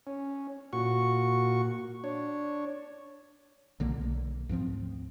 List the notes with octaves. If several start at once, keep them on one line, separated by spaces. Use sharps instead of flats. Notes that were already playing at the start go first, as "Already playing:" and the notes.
C#4
A#2 F#4 C#6
D4 C#5
B1 D3 A#3
B1
D2 G#2 F3 C4